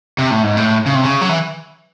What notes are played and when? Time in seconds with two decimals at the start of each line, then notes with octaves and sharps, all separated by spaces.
0.18 C3
0.31 A2
0.43 G#2
0.57 A2
0.86 C#3
0.95 C3
1.04 C#3
1.21 F#3
1.29 E3